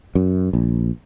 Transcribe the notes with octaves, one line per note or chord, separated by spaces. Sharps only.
F#2
A#1